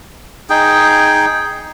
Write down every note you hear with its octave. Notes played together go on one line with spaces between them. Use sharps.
D#4 G#4 G5